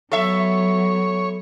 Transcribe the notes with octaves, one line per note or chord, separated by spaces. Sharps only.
F#3 B3 A4 C#5 E5